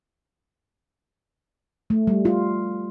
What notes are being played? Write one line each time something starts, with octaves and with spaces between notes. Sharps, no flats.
A3
G3
F4